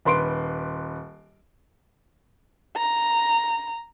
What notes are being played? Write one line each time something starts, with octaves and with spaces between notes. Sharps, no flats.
D#1 B4 C6 D7
A#5